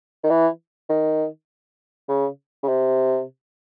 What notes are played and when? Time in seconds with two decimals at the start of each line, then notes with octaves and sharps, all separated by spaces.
0.24 D#3
0.30 E3
0.89 D#3
2.09 C#3
2.63 C#3
2.68 C3